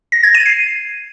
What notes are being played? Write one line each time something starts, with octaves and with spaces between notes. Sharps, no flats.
A#6
G#6
D#7
C7